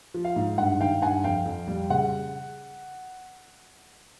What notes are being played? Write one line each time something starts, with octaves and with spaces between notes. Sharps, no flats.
F3
F5
G#2
G2 F#5
D#3 F5 G5
G2 F#5 G#5
F2 F5 G5
F2
G3
C#3 F#5